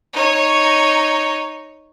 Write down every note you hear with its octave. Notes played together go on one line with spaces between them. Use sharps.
D#4 C#5